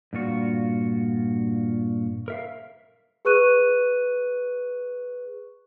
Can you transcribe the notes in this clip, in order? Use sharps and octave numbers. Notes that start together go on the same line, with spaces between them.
G2 A#2 F4 F#4
A#4 E5 F5
G#4 B4 C#6 F#6 D#7